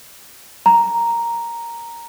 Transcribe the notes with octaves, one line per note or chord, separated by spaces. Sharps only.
A#5